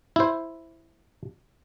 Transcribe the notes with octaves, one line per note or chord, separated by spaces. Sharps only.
E4 C5